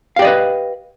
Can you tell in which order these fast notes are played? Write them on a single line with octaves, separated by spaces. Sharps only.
F5 G4 D5 D#5 B4